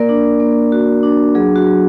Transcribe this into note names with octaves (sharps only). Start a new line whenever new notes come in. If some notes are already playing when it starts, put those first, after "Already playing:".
Already playing: A#3 A#4 D5
D4
A#3
F#4
D4
F#3 G#4
F#4
F#3